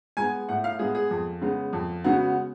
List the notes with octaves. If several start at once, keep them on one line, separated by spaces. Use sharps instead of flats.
G#3 B3 G#5
A2 F#5
F5
G#3 B3 G#4
G#4
F2
C#3 G#3 B3
F2
C#3 G#3 B3 F#4